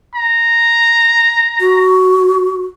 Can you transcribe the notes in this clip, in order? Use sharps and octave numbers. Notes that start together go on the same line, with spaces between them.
A#5
F#4